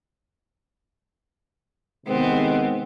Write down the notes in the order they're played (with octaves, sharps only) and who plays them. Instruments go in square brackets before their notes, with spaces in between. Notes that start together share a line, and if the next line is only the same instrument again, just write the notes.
[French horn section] C3 D#3 G#3 [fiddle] B3 C4